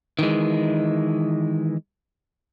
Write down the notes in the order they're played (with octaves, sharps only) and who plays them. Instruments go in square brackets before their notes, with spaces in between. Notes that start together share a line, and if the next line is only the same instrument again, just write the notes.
[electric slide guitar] D#3 E3 G#3